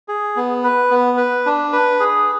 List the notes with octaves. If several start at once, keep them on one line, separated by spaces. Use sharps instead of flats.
G#4
B3
B4
B3
B4
D4
B4
G#4